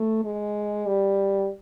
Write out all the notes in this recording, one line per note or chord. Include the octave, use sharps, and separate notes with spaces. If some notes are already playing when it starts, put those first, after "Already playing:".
Already playing: A3
G#3
G3